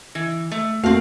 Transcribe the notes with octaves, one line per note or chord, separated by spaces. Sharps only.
E3
A3
A3 A#3 C4 F#4 F5